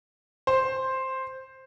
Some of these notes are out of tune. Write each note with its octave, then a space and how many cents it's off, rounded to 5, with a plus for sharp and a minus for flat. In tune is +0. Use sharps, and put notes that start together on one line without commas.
C5 +5